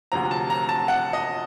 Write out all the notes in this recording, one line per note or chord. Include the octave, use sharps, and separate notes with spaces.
D2 C3 F3 A#5
A5
A#5
A5
F#5
D#5